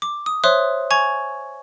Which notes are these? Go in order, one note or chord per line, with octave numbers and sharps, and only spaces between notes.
D6
D#6
C5 C#5 E5 C6 D#6 F#6
G#5 C#6 G#6 F7